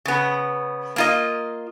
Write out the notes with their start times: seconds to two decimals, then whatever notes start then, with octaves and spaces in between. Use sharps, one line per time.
0.05 C#3 B3
0.96 A#3 F4 D#5